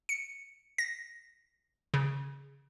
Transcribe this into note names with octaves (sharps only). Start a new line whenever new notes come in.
C#7
A#6
C#3